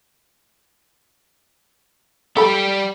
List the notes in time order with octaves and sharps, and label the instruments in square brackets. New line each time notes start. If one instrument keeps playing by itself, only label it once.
[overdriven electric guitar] G3 G4 [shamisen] A4 B5